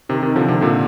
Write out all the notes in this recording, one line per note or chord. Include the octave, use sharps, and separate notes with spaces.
C3 D#3
C3 D#3
D3 F3
C3 D#3
A#2 D3